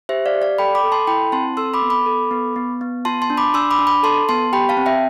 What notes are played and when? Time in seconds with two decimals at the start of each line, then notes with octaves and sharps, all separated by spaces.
0.09 G4 C5 E5
0.26 D5 F5
0.35 G4
0.42 D5 F5
0.58 A4 G5 B5
0.75 B5 D6
0.84 A4
0.92 A5 C6
1.07 E4 G5 B5
1.32 C4 A5 C6
1.57 A4 C6 E6
1.74 B5 D6
1.82 B3
1.90 B5 D6
2.06 A4
2.31 B3
2.56 B3
2.81 B3
3.05 F4 A5 C6
3.22 A5 C6
3.30 D4
3.37 B5 D6
3.54 D4 C6 E6
3.71 B5 D6
3.79 D4
3.87 B5 D6
4.03 A4 A5 C6
4.29 B3 A5 C6
4.53 G4 G5 B5
4.69 F5 A5
4.77 C4
4.86 E5 G5